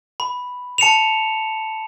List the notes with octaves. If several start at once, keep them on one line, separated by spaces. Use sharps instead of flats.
B5
A5 C#7 E7 F7